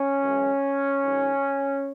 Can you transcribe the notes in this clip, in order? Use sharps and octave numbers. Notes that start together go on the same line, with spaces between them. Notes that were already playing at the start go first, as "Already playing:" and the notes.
Already playing: C#4
F#2 E3 G#3
G#2 D#3 F#3